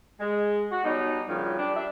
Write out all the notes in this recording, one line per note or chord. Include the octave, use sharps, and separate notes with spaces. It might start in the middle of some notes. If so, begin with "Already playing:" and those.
G#3
F#4
B2 F#3 G3 D#4
G2 A#2 C#3 F3 F#3
G3 D4
G3 D4 E5